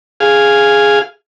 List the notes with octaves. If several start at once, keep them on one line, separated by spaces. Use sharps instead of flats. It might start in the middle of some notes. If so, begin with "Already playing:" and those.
G#4 F5